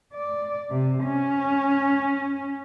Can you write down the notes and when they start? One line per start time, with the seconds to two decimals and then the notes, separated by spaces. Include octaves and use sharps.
0.13 D5
0.70 C3
1.03 C#4